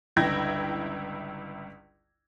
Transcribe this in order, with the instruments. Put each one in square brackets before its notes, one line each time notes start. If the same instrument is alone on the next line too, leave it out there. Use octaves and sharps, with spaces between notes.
[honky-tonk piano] G1 C#2 E4 G5 G#6 A#6